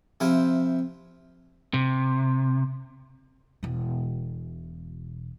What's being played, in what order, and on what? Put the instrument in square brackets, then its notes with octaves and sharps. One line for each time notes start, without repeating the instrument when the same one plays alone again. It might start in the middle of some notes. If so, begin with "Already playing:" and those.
[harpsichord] C3 F3 E4 F4 C5
[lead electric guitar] C3
[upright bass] E1 B2